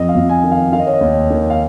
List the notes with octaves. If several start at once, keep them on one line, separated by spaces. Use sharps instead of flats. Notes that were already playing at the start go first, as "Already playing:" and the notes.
Already playing: F2 D#5
F5
F2
G#5
D#3
F5
D#3 F5
D#5
C#5
D#5
D#2
D#3
F5